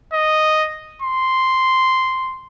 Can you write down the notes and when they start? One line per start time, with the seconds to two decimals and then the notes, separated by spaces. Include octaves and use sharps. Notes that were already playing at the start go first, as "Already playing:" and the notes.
0.13 D#5
1.02 C6